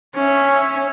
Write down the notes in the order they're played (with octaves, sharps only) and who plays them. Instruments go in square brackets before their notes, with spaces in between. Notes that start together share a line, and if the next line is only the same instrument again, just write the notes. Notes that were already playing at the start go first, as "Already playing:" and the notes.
[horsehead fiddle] C#4 E5